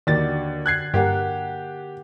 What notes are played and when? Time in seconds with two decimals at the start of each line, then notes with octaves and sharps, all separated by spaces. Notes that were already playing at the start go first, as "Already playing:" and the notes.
0.07 D#2 D3 D#3 F#4 D5 A6
0.66 F#6 G#6 C7
0.94 G2 A#3 G4 A#4 F#5